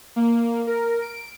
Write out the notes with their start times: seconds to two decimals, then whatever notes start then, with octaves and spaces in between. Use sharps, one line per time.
0.16 A#3
0.67 A#4
1.02 D7